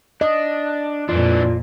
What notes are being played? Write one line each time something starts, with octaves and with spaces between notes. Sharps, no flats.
D4 D#5
F2 A#2 E3 D4 F4 D5